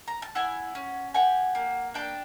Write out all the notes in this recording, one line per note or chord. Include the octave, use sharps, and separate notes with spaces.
A#5
A5
E4 F#5 G#5
C#4
G4 F#5 G#5
A#3
D4 G5 A5